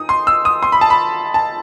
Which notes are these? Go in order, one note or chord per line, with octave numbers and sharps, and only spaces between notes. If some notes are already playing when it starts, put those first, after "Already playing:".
Already playing: D#4 D#6
C6
E6
D#6
C6
B5
A5
B5
A5